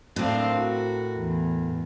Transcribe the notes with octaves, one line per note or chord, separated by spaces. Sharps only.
A2 C4 D4 A#4 F5
F#4
E2